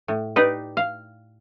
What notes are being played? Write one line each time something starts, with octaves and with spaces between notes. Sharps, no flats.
A2
D#4 G4 B4 D5
F5